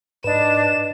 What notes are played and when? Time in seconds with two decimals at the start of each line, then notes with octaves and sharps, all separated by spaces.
0.24 G#2 D4 B4 D#5 E7